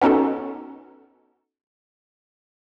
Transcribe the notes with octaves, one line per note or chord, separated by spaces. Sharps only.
B3 C#4 D#4 F#4 A4